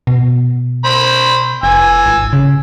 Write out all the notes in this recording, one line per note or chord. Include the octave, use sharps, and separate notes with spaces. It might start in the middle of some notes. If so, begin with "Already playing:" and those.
B2
C5 B5
F1 G#5 E6
G#1
C#3